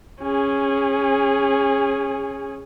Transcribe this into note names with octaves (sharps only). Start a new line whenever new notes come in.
C#4 G#4